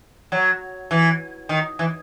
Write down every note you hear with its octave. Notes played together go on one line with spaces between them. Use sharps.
F#3
E3
D#3
E3